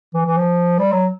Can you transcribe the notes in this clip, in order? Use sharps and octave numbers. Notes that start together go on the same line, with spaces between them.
E3
E3
F3
G3
F#3